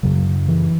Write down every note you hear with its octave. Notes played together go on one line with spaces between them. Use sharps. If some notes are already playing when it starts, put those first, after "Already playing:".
F#2 C#3 F#3
E3